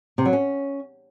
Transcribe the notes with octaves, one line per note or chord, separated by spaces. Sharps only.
C3
F#3
C#4